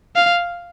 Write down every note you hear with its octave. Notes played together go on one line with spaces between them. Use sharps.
F5